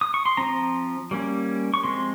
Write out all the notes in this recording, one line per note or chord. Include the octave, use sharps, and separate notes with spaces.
D#6
C#6
C6
F3 C4 A#5
G3 A#3 C#4
C#6
F3 G#3 C4 C6